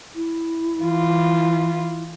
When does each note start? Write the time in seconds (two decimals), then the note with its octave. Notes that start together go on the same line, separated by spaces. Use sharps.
0.16 E4
0.82 E3 F4